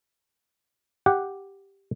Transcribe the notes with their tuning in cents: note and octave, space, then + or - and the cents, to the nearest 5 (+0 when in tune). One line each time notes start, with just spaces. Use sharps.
G4 +0 F#5 +0